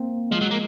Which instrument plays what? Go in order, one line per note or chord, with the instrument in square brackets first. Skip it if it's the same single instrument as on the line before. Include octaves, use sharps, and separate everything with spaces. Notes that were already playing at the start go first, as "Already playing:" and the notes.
Already playing: [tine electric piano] A#3 C4
[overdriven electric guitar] F3 [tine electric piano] G#3
[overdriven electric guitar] F#3
A#3